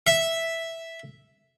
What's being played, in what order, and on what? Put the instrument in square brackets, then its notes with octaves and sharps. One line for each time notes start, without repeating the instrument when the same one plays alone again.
[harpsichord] E5